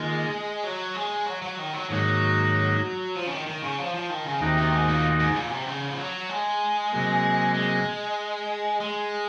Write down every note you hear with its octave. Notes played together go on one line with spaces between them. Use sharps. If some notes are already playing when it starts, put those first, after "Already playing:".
Already playing: D#3 G#3 A#3 F4
F#3
G#3
F#3
F#3
D#3
F#3
G#2 D#3 F#3 A#3 D#4 F#4
F3
C#3
D#3
D#3
C#3
F3
F3
D#3
C#3
D#2 C3 D#3 A#3 D#4 F#4
C3
G#2
A#2
G#2
A#2
C3
C#3
F3
F#3
G#3
C3 F#3 A#3
G#3
G#3